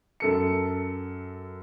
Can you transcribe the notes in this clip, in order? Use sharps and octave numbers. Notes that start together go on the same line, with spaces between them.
F#2 A4 C#7